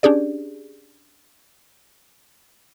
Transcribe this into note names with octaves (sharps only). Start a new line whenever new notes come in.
C#4 D4 G4 G#4 D5